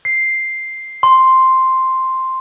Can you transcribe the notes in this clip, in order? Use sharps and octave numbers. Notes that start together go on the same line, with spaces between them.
C7
C6